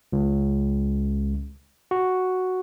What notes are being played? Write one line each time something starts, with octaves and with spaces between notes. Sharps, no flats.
C#2
F#4